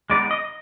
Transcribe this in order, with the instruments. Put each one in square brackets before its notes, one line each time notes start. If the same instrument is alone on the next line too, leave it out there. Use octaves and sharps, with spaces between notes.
[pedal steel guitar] G#3 B3 D#4 D5
D#5